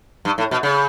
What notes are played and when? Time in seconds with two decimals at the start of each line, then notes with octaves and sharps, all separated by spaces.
0.25 G2
0.38 A2
0.51 B2
0.63 C#3